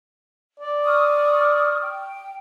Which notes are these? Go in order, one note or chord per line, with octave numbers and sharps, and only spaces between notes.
D5
C#6 D#6 F6
G5